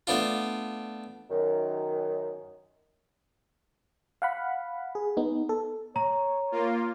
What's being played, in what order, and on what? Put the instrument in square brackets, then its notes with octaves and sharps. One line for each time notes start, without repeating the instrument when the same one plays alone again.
[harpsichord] A3 B3 D4 F4
[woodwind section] F#2 D#3
[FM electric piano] F5 F#5 B5
G#4
B3 D#4
A4
[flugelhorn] C#5 [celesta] A#5
[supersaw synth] A#3 F4